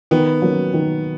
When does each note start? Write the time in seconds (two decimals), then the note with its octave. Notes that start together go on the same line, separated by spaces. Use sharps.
0.11 D#3 B3
0.42 F#3 A#3 C#4
0.74 D#3